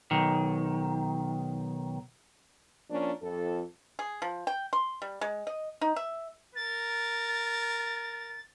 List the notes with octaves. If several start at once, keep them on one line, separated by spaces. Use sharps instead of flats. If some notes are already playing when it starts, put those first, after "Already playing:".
B1 D#3
F3 A#3 C#4 D4
F2 A4
G#4
F3
G5
C6
G3
G#3
D#5
D#4
E5
A#4 A6